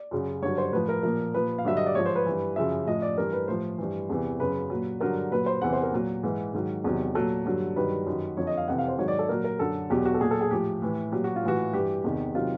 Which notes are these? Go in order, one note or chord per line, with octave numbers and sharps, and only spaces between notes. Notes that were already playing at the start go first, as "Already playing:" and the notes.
Already playing: D5
F#2 C#3 F#3
G2 D3 F#3 C#5
C5
A2 F3 B4
A#4
A#2 F3 A#4
A#2 F3 B4
F5
G2 D3 F#3 E5
D#5
D5
G#2 F3 C#5
C5
B4
G2 E3
F#2 C#3 F3 E5
A2 F3 D#5
D5
G2 E3 A#4
B4
A2 F3 C5
G2 E3
E2 C3 E3
F#2 C#3 F#3 B4
A#2 F#3
G2 D3 F#3 A#4
A#2 F#3 B4
C5
E2 C3 E3 F#5
C5
A#4
A#2 F#3
G#2 E3
G#2 D#3 F#3
E2 C3 D#3 F#3
A#2 F#3 A4
G2 D3 F#3
G2 D#3 F#3 B4
F#2 D#3 F#3
F2 D3 F3 C#5
D#5
F5
F2 C3 E3 F#5
F5
C5
G#2 D#3 F#3 C#5
D5
A4
A#2 F#3 A#4
A#4
F#2 D3 F#3 A4
E2 B2 F#3 G4
F#4
A4
A#2 F#3 G#4
A4
G#4
A2 F3 G4
A2 E3
A#2 F#3 G4
F#4
F4
A2 E3 F#4
G2 E3 G4
E2 C3 D#3
C3 D#3 F#3 F4